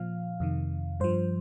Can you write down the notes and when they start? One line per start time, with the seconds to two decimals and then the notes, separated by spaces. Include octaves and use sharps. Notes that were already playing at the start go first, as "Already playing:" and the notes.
Already playing: A#2 F3 F5
0.40 F2 C3 D#3
1.00 G2 F3 C5